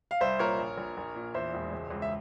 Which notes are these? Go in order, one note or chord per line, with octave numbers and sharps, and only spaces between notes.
F5
C2 C5 E5
A#2 A#4 C#5
A#1
A#1
A#1
A#2
E2 C5 E5
E1
C#2
C#2
E5